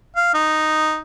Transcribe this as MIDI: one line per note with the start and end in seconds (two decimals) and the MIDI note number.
0.16 0.32 77
0.34 0.99 63